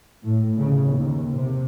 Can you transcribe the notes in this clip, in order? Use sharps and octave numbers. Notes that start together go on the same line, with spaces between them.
A2
C#3
D#2
C3